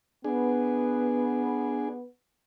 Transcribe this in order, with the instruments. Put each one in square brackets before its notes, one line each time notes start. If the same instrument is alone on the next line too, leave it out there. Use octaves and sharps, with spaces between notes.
[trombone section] B3 [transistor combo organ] D4 G#4